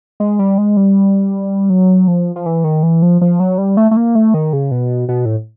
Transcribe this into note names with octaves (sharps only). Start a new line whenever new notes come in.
G#3
G3
G#3
G3
F#3
F3
F3
E3
D#3
E3
F3
F3
F#3
G3
A3
A3
A#3
A3
D#3
C#3
B2
B2
A2